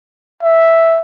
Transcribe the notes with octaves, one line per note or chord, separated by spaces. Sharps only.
E5